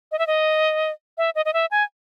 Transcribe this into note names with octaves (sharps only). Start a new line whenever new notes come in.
D#5
E5
D#5
E5
D#5
D#5
E5
G#5